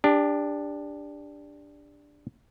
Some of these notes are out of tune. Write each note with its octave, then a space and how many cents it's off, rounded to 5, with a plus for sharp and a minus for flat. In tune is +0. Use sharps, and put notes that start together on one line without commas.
D4 +0 G4 +30